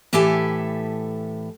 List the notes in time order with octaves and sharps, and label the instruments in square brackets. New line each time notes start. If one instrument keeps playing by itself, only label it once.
[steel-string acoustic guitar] A2 E3 G4 A4 E5 G#5